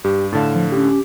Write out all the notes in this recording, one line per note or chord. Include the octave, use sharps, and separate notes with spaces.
G2 G4
A2 D3 F5 A5
F3
C#4 G4